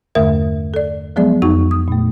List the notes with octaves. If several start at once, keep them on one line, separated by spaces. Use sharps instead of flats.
E2 G2 D3 A3 A#4 E5
A4 D5
F3 F#3 G#3 B3 G#4 D5
F2 D#4 F#4 C#6
D#6
A#2 A3